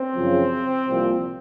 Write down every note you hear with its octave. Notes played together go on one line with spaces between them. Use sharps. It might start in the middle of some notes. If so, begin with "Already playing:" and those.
Already playing: C4
F#2 C#3 F3
C2 A#2 F3